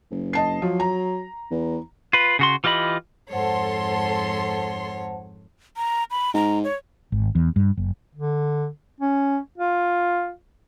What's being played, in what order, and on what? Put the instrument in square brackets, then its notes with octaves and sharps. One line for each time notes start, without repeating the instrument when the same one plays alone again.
[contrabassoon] F#1
[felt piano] D#5 A5 C7
[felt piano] F3 [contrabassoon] F#3
[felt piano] A#5
[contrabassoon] E2
[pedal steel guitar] F4 B4
C#3 F#4 C6
E3 F4 G4 D#5 B5
[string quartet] F2 G#2 C#5 [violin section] A4 C6 [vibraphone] C5 F#5 A5
[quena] A#5
B5
[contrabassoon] G#2 [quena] A#5
[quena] C#5
[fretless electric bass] G#1
E2
G2
F#1
[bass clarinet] D3
C#4
F4